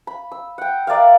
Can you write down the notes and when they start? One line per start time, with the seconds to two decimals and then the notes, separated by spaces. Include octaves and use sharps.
0.07 B5
0.32 E6
0.58 F#5 G5
0.87 A#4 D5 E5 F5